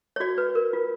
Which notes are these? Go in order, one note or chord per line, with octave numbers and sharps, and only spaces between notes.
C#5
F#4 D5
B4
A#4
F4